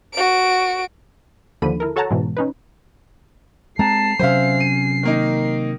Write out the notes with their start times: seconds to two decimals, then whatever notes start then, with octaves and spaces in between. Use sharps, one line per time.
0.13 F#4 D7
1.62 D#2 D3 F3 B5 D#7
1.80 E4 A4 A#4
1.96 F#4 A4 C#5 F#5 A5 A#5
2.11 G#2 B2 E3
2.37 C#4 D#4 B4
3.79 G#3 C4 A5 A#5 C7
4.19 C3 F#3 C#4 C5 E5 F5
4.60 D#7
5.03 D#3 A#3 D#4